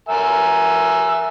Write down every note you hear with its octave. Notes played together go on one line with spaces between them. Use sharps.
A#4 E5 G#5